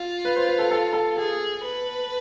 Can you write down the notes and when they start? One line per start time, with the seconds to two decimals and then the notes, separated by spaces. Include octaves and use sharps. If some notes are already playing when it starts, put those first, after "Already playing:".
Already playing: F4
0.25 B4
0.36 C5
0.47 B4
0.59 A4
0.71 A4
0.93 A4
1.17 G#4 A4
1.63 B4